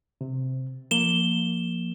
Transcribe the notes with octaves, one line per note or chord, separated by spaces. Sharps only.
C3
F3 A#3 E7 G7